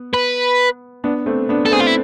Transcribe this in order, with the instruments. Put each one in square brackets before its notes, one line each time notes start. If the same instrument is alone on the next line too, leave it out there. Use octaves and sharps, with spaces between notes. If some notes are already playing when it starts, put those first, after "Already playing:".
Already playing: [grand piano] B3
[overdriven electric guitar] B4
[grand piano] B3 D4
A3 C4
B3 D4
[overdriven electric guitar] A4
[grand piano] A3 C4 [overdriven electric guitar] G#4
[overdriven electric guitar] F4
E4